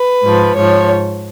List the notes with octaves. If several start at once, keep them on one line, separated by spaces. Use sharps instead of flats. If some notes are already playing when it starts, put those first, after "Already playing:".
Already playing: B4
G#2 F3
G#2 F3 C#5